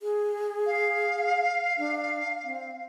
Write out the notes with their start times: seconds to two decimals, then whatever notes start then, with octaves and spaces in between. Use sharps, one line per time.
0.01 G#4
0.66 F5
1.78 D4
2.44 C4